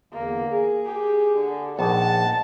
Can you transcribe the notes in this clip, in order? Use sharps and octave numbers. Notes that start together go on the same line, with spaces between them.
E2 D3 A#3
G#4
G4
D3
A#1 D#4 F#5 A5